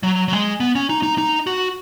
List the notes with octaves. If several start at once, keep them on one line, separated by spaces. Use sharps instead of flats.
F#3
F#3
G#3
B3
C#4
D#4
D#4
D#4
F#4